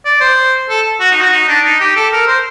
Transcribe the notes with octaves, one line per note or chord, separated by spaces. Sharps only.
D5
C5
A4
F#4
D#4
F#4
D#4
D4
D#4
G4
A4
A#4
C5